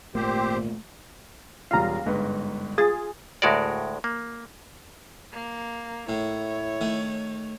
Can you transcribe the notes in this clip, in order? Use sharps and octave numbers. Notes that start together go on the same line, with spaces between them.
G#1 A#2 A3 A#3 C4 G4 C5
E1 G3 F4 F5 A#5
G1 G#2 B4
F4 G#4 A6
D2 A2 G#3 F#4 A#4 D5
A#3
A#3
A2 E4 C#5
D#3 A3